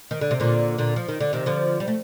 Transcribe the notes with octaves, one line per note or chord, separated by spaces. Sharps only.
D#3
D3
C3
A#2 D3
A#2 D3
F3
D#3
D3
C3 D#3
D3 F3
G3
A3